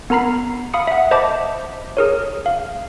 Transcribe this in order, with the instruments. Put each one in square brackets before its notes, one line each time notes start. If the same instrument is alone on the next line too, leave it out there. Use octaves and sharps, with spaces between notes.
[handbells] B3 A#4 A#5 B5 C7
F5 B5 D#6 C#7
E5 F#5
C5 D#5 E5 A5 B5 D6
G#4 A#4 C#5
F5